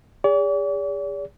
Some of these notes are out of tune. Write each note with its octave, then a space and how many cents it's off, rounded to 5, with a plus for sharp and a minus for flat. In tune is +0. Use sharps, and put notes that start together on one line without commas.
G#4 -40 D5 -45